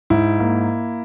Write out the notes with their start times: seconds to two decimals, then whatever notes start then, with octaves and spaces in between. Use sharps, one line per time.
0.10 G#2 E4
0.40 A#3